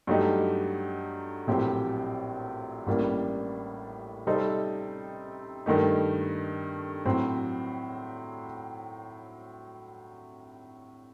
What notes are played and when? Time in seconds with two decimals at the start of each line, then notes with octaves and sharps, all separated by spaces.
0.07 G2 F#3 A3 D#4 G4
1.47 A#1 A2 F#3 C4 G4
2.87 A1 A2 G3 A#3 D4
4.27 C3 G3 C4 D#4 A4
5.66 G2 D#3 A3 D#4
7.06 A2 F#3 C4